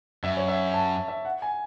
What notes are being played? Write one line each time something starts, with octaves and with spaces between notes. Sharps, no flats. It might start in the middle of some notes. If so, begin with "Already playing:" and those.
F#2 E5
C#5
E5
A5
E5
F#5
G#5